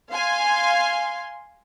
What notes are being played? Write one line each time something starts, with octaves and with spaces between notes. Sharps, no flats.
F5 G#5 C6